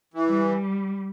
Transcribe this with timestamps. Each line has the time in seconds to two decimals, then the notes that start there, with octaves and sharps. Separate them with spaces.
0.14 E3
0.29 G3